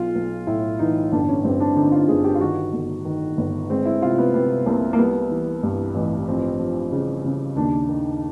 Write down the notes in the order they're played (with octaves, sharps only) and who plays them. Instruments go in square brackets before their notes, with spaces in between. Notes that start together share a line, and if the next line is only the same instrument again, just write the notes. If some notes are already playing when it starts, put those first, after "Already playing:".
Already playing: [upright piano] B1 F4
B1
A2 E4
E3 D#4
G1 D4
C#4
G2 C4
D4
D3 D#4
F4
G1 G#4
G4
F4
D#3 F#4
G1
D#3
G1
G#3 C4
E4
C3 F4
B3
C3 B3
C2 A#3
A#3
G3 B3
E3
G2
A1
F3 C4
F3
C#3
C#3
D#2 D4
D#3